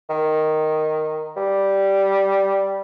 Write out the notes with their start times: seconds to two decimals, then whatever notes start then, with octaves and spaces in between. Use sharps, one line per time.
0.10 D#3
1.36 G3